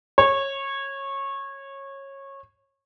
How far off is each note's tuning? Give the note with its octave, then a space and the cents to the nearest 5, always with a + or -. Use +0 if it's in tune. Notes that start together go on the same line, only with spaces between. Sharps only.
C#5 -20